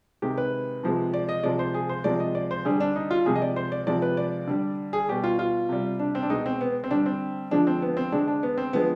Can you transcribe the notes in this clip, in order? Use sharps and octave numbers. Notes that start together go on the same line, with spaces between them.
C3 D#3 G#3 G4
B4
C3 F3 G#3
D5
D#5
C3 F3 G#3 D5
C5
G#4
C5
C3 F3 G#3 D5
D#5
D5
C5
D3 G3 G#4
D4
D#4
F4
C3 F3 G#3 G#4
D#5
D5
C5
D5
C3 F3 G#3 D5
B4
D5
D3 G3
G#4
B2 G3 G4
F4
F4
C3 G3
D4
C4
D4
B2 G#3 D#4
C4
B3
C4
D3 G3 D4
C4
D3 F3 G#3 D4
C4
B3
C4
D3 G#3 D4
D4
B3
C4
D3 F3 G#3 B3